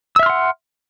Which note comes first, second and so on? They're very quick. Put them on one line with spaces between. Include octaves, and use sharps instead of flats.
E6 E5 F6 C6 F#5